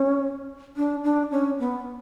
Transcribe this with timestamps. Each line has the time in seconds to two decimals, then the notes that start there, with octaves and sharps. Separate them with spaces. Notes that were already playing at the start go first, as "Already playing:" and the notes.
Already playing: C#4
0.77 D4
1.04 D4
1.31 C#4
1.59 B3